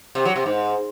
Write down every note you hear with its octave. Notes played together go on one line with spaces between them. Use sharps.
C3
F#3
C3
G#2